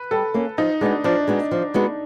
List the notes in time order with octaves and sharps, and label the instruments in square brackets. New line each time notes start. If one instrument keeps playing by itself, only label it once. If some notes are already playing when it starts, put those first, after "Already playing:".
Already playing: [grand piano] B4
[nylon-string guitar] G3 [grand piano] A4
[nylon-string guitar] A#3 C#4
[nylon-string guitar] F3 [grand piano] D#4
[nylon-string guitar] G#3 B3 D#4 F#4 [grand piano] D4
[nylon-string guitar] F3 [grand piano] D4
[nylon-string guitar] G#3 B3 D#4 F#4
F3
G#3 B3 D#4 F#4